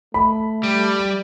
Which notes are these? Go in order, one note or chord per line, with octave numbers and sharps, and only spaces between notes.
A3 B5
G3